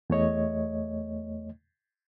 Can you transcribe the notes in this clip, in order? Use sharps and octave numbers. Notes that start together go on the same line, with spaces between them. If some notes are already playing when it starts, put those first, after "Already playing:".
E2 A3 C#5 D#5